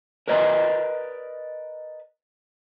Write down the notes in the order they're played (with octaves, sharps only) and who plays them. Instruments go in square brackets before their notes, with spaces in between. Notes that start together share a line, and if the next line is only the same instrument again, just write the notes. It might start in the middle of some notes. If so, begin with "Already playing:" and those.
[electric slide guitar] A#4 B4 D5 D#5 A#5